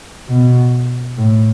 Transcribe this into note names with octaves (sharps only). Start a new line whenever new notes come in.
B2
A2